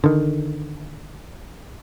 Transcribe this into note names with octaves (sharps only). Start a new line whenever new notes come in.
D3 D#3